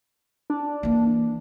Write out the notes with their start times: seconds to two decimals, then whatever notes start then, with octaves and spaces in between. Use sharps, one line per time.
0.50 D4
0.83 E3 A#3